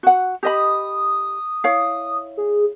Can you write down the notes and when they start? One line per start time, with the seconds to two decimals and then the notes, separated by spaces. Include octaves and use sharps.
0.03 F#4 F#5
0.43 G4 D#5 B5 D#6
1.64 E4 C#5 F5
2.37 G#4